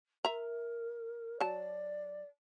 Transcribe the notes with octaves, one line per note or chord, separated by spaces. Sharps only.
A#4 E5 A#5
F#3 D5 A5